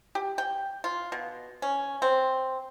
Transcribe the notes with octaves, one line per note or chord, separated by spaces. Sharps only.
G4
G5
F4
B2
C#4
C4